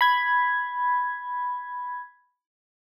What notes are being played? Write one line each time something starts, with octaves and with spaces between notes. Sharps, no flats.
B5 G#6